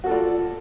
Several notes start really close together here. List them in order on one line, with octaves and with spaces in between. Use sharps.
F#4 A4 F4 D5